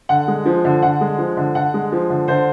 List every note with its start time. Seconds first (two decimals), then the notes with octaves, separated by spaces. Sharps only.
0.09 D3 F#5
0.28 G#3
0.45 F3
0.65 D3
0.82 D3 F#5
1.01 G#3
1.18 F3
1.37 D3
1.55 D3 F#5
1.74 G#3
1.92 F3
2.10 D3
2.28 D3 C5